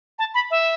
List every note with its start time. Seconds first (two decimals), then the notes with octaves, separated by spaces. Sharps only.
0.19 A5
0.34 B5
0.51 E5